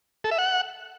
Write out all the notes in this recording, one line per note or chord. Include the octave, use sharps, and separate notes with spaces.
A4
E5
F#5